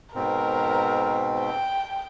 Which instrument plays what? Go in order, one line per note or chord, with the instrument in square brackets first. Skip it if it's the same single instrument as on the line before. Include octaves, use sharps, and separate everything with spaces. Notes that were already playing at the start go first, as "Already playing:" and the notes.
[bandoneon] G#2 B2 C4 [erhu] A#4
[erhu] G5